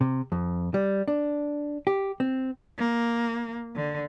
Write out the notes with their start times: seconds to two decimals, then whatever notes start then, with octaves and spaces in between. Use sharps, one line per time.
0.01 C3
0.32 F2
0.74 G3
1.08 D4
1.87 G4
2.20 C4
2.78 A#3
3.75 D3